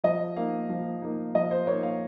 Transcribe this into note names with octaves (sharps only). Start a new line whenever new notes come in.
F3 D#5
A#3 D#4 F5
F3
A#3 D#4
F3 D#5
C5
A#3 D#4 C#5
F5